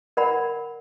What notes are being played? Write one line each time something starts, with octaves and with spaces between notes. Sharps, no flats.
A#4 D5 F#5 B5